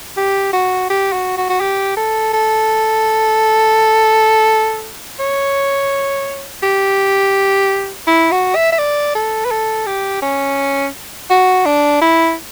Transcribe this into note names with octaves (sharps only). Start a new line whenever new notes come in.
G4
F#4
G4
F#4
F#4
F#4
G4
A4
A4
C#5
G4
E4
F#4
E5
E5
D5
A4
B4
A4
G4
C#4
F#4
D4
E4